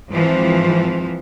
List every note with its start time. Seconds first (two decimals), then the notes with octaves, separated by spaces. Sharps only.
0.10 G#2 E3 F3 C4